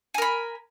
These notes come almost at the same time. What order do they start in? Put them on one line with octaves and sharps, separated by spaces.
G#5 A#4 B5